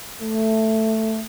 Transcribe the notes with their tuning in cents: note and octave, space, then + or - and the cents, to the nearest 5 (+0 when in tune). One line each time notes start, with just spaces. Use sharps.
A3 +5